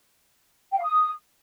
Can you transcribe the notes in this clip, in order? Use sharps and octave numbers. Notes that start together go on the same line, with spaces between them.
G5
F5
D#6